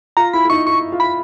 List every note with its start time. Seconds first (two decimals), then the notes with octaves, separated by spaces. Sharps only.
0.17 F4 A#5
0.33 E4 B5
0.45 E4
0.50 D#4 C#6
0.67 E4 C#6
0.92 F4
1.00 B5